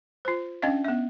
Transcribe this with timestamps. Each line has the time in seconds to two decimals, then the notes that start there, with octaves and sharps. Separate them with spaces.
0.25 F4 C5
0.62 C#4 D4 D#5 F5
0.84 B3 E5